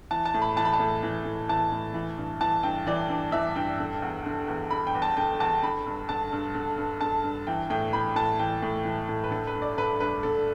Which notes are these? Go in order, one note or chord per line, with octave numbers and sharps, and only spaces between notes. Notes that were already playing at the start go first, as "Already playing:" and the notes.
E3 A5
A5
A2
B5
E3 A5
B5
A5
A2
E3
A2
E3 A5
A2
E3
G2
E3 A5
G2 G5
E3 D5
G2
E3 E5
G2 G5
D3
E2
D3
E2
D3 B5
G5
E2
A5
D3 G5
E2 A5
D3 B5
G2
D3 A5
G2
D3
G2
D3 A5
G2
E3 G5
A2 G5
E3 B5
A2 A5
E3 G5
A2
E3
A2
B4
D3 A4
B4
G2
D5
D3 B4
G2 B4
D3 A4